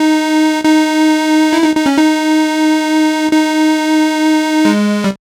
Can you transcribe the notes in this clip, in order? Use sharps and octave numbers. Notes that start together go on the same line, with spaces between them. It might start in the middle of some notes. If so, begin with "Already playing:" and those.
Already playing: D#4
D#4
E4
D#4
D#4
C#4
D#4
D#4
G#3
G3